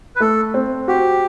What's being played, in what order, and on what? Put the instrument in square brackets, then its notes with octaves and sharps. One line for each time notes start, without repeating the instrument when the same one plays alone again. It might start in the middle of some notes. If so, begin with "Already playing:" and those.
[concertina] B4
[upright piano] A3 [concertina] A4
[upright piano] C4
[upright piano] F#4 [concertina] G4